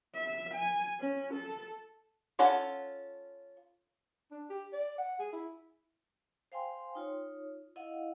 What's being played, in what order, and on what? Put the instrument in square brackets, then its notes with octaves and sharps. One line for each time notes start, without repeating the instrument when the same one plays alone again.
[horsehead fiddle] E5
G#5
C#4
A4
[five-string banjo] C#4 F4 A4 F#5
[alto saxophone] D4
G4
D5
F#5
G#4
E4
[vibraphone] C5 F5 G5 G#5 C6
D#4 F4 C#5
E4 D#5 F5 F#5